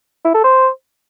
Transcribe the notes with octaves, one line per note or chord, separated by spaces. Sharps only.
E4
A4
C5